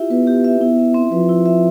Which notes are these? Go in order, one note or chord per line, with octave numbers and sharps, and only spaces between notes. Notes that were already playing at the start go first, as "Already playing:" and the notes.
Already playing: E4 F4 G4 E5
B3 B4
G4
E5
B3 E4
E5
C4
F3 B4
E4
E5